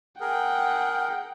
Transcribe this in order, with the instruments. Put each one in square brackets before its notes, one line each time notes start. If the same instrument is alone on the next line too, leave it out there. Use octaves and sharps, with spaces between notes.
[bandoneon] G#4 A#4 [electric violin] F#5 G5